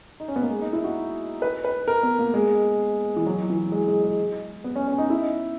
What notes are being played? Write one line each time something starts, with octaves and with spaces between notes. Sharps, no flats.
D#4
C#4
B3
A#3
G#3
D#4
E4
F#4
B4
B4
A#4
B3
A#3
G#3
E3
F#3
E3
G#3
G#3
G#3
B3
C#4
C#4
D#4
E4